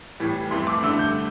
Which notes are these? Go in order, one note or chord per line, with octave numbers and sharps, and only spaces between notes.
A2 E3 G3
F2 E3 A3 C6
D6
G2 D3 A3 E6
G6